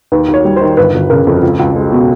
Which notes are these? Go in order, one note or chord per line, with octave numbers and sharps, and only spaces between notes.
D#2 B4
D#2
C#5
G3
C5
D#3
G1 B4
G1
C#3 A#4
F2
C#2
C#2
G#3
B2